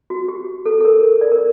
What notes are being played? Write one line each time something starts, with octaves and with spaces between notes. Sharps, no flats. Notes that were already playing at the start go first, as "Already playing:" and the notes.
F#4
G4
A4
A4
A#4
A#4
D5
A#4